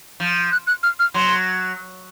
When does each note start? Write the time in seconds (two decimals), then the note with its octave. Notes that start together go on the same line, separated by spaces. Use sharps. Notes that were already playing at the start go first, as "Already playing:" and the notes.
0.20 F3
0.52 F#6
0.67 F#6
0.83 F6
1.00 F6
1.14 F#3 C6